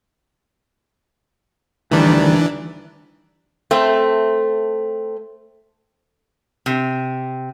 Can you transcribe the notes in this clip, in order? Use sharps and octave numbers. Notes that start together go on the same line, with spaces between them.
D2 D#3 E3 G3 D4
A3 C4
C3